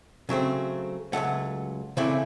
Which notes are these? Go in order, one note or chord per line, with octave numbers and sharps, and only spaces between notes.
C#3 F#3 A3 C4
C#2 B2 F#3 A3 F#5
C#3 E3 A3 C4 E4 D5